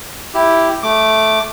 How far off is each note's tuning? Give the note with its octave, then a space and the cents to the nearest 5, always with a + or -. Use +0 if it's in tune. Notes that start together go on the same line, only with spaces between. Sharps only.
E4 +0 G4 +0
A3 -5 D6 +0